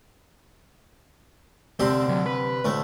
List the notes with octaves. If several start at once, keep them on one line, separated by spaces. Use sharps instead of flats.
C2 D3 C4 G4
D2 F#3
B4
D2 A2 A3